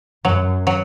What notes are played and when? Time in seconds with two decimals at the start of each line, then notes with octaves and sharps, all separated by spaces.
0.25 F#2 F#3
0.67 F#3